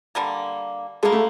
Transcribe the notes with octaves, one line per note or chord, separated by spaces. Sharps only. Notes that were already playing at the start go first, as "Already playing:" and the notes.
D3 G3 A#3
D3 G3 G#3 A#3
A3